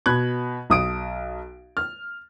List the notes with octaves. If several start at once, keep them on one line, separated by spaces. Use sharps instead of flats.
B2 B5 F#6 G#6
B1 D#6 D7
F6